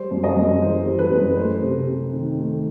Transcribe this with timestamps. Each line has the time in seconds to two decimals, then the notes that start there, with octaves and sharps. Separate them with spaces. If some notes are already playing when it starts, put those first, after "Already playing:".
Already playing: G3 C5
0.11 F#2
0.24 D#5
0.36 F#2
0.62 E3 C5
0.86 G3
0.99 B4
1.11 F#2
1.37 A3 C5
1.63 C3
1.88 C4
2.13 D#3
2.37 A3